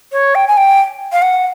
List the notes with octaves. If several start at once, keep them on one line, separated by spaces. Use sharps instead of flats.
C#5
G5
G#5
G5
F5
F#5